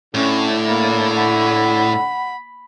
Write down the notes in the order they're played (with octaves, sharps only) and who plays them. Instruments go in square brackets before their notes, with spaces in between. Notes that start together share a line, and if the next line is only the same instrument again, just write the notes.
[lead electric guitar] A2 [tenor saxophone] D3 [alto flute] C#4
[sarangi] A#3 [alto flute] B5
[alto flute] F#5 [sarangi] B5